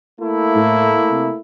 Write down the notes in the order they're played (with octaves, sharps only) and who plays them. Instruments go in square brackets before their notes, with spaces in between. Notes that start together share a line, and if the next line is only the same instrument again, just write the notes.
[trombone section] A3 A#3 E4
[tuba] A2
C3